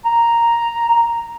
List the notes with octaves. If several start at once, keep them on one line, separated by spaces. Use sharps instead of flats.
A#5